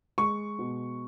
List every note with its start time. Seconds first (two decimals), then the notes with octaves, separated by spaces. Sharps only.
0.18 G#3 C#6
0.59 B2